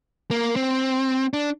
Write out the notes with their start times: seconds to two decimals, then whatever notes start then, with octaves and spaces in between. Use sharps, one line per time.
0.31 A#3
0.56 C4
1.33 D4